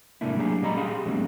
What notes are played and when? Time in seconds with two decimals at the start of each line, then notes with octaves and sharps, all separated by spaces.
0.21 G#2 C3 A3 A#3 D4 E4
0.37 F#3 A#3 D4 G4 G#4
0.62 A#2 G3 C#4 D#5 A#5 B5
0.77 G4 G#4 F5 C6
1.06 G#2 B2 F#3 A3 C4 D4